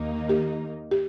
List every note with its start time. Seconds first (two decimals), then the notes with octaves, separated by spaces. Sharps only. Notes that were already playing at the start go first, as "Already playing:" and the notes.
Already playing: D#2 D#3 A#3 D#4
0.29 G4
0.91 G4